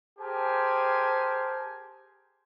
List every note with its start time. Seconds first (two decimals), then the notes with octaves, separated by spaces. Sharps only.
0.20 G4 G#4 A#4 C5 G#5 A5